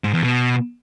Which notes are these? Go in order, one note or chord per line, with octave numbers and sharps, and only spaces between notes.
G#2
E2
B2